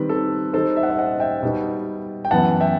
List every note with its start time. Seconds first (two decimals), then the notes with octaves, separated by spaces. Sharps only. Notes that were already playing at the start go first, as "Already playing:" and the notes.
Already playing: D#3 G3 C4 B4
0.09 A4
0.53 D#3 G3 D#4 A4 C5
0.76 E5
0.83 F#5
0.90 C5 E5
0.98 D#5 F#5
1.20 E5 G5
1.43 B2 G3 B3 D#4
2.25 G5
2.31 F#2 E3 B3 E4 F#5 A5
2.60 E5 G5